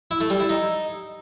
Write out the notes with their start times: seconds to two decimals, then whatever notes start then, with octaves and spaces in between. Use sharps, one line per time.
0.11 E4
0.20 A3
0.30 G3
0.40 E4
0.49 D#4